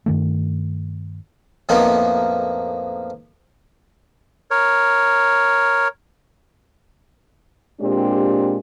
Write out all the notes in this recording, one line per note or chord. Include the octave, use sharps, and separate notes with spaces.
G2 D#3 A3
F2 A2 F3 A#3 B3 D#4
A#4 C#5
A#2 G#3 C4 D4 G4